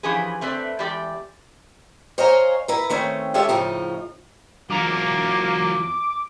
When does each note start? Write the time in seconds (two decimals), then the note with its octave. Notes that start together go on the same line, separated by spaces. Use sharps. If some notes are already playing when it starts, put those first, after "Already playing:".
0.03 E3 F3 C#4 G4 G#4 B4
0.41 A3 C4 B4 C5 D5
0.79 E2 G#3 G4 D5 G5
2.18 C5 C#5 D#5 F5 G#5 A#5
2.68 E4 A#4 B4
2.90 D#3 A3 C4 C#4
3.34 G#3 C#4 F4 G4 A4 E5
3.49 A2 C#3 F3 D#4
4.70 E2 F#3 A#3 F4 A#5 D6